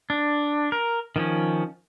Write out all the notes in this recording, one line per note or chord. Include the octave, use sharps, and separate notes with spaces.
D4
A#4
D#3 F3 C#4